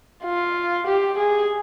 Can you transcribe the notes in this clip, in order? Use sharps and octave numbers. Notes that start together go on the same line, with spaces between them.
F4
G4
G#4